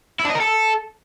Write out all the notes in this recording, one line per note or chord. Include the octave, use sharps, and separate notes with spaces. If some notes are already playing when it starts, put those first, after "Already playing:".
E4
D4
D#5
A#4
A4